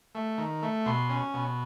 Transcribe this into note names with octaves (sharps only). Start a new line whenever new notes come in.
A3
D#3
A3
B2 C6
C#4
B2